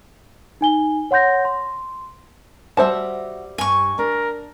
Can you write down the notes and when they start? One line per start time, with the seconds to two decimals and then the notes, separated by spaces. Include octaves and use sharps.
0.61 D#4 G#5 G7
1.11 C#5 F#5 C6 G6 A#6
1.45 C6
2.77 G3 F#4 C5 E5 A5
3.58 G2 G#5 C#6
3.99 D4 A#4